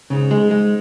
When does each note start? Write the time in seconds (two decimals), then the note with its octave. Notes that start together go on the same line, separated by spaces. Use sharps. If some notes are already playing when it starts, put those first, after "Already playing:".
0.10 G#2 C#3
0.31 G#3
0.40 G#2
0.51 G#3